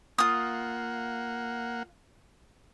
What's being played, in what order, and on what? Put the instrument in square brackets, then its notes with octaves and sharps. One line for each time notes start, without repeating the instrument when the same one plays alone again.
[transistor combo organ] A#3 F#5 [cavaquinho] F4 D#6